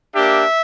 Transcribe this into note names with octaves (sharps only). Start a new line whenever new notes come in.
A#3 D4 G4 E5